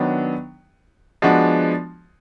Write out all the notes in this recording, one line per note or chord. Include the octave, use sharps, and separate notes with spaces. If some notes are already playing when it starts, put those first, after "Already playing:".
Already playing: D#3 F#3 B3 D4
F3 G#3 B3 D4 F#4